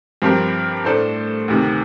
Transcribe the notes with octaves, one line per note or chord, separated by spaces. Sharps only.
G2 F3 C4 G4 A#4
A2 A3 D4 A4 C5
D2 C3 D#3